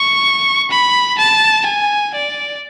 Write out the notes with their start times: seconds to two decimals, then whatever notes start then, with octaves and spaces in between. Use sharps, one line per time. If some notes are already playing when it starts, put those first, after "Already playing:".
Already playing: C#6
0.71 B5
1.18 A5
1.66 G#5
2.14 D5